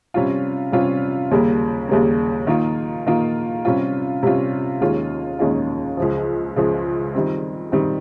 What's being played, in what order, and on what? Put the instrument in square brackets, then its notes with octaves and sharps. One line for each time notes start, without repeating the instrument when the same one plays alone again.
[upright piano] C3 G3 C#4 F4
C3 G3 C#4 F4
D#2 C#3 G3 A#3
D#2 C#3 G3 A#3
D#3 A#3 F4
D#3 A#3 F4
C3 G3 C#4 F4
C3 G3 C#4 F4
D#2 D#3 G#3 C#4 F4
D#2 D#3 G#3 C#4 F4
C#2 C#3 F3
C#2 C#3 F3
D#3 G3 C4
D#3 G3 C4